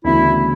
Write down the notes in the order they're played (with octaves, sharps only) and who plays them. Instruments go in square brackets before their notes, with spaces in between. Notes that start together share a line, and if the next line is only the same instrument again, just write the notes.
[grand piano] D2 C#3 E3 B3 F#4 [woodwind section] E4